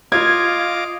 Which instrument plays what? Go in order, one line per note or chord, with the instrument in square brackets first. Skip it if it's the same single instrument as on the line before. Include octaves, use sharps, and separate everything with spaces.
[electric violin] F4 [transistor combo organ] D#5 F5 D6 [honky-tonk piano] G#6